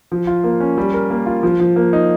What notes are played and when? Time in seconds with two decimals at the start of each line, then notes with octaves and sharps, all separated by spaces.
0.12 F3
0.27 F4
0.44 A#3
0.60 C#4
0.77 G3
0.94 A#4
1.10 A#3
1.26 F4
1.43 F3
1.60 F3
1.76 A#3
1.93 D#4